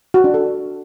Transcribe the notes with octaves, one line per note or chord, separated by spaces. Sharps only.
F#4
D4
A4